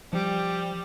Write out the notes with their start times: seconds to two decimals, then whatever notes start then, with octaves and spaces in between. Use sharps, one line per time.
0.13 F3 G3